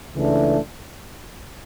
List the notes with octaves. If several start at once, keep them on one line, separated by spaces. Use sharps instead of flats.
C#2 C#3 E3 A3 D4